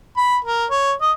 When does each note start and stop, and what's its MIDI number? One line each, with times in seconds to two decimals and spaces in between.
0.17 0.37 83
0.45 0.65 70
0.70 0.93 73
1.01 1.11 75